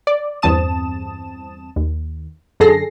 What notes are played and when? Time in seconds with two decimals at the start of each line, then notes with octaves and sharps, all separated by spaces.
0.07 D5
0.42 E2 G2 C4 A5 D#6 E7
1.76 D#2
2.60 F#2 D3 G#4 A4 A#6 C7